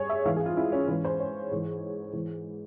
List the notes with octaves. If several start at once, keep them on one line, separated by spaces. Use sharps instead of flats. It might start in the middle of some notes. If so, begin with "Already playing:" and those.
Already playing: G2 G#4 C#5
E5
G#2 E3 F5
G#4
F4
E4
C#4
G#2 E3 C#4
C5
C#5
G#2 E3
G#2 E3